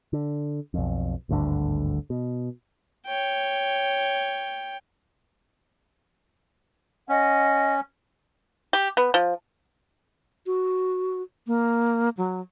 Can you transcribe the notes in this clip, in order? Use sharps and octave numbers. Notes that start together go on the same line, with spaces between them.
D3
B1 F2
G#1 D2 G2 D3
B2
C#5 G5
C#4 D#5 F#5
G4
B3
F3
F#4
A#3
F#3